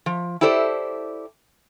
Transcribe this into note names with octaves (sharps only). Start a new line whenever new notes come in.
F3
E4 G4 A4 C5 D5